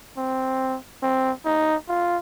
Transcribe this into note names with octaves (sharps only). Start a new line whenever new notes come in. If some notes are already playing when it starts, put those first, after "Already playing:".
C4
C4
D#4
F4